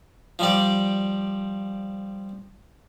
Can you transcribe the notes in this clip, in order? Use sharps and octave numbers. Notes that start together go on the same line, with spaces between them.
F3 G3 D5